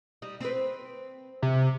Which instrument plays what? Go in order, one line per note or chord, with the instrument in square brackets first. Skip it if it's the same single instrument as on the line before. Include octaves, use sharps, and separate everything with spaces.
[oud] G3 D#4
C4 B4
[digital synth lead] C3